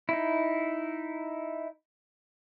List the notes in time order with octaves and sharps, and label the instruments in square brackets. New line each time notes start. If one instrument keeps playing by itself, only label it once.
[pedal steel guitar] D#4 E4